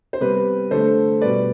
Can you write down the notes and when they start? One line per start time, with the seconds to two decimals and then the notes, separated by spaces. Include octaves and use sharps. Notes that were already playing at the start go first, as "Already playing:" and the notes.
0.13 C5
0.21 C3 G3 B3 B4
0.71 D3 A3 A4 C5
1.21 B2 G3 B3 B4 D5